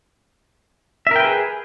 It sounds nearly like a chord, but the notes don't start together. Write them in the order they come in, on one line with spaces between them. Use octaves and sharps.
E5 A#4 G5 B4 G#4